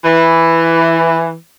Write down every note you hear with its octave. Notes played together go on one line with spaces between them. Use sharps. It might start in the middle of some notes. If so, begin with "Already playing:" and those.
E3